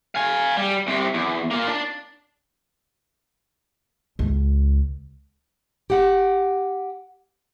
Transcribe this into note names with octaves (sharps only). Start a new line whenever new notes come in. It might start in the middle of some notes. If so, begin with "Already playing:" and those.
F5 G#5
G3
C2 C3
E2
A#3 F4
D4 A5
C#2
G4 F#5